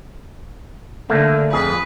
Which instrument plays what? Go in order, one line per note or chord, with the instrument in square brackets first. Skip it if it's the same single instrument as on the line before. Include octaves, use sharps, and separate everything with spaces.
[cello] D3 [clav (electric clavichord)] A3 A#3
[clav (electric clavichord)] F2 G#4 [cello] B4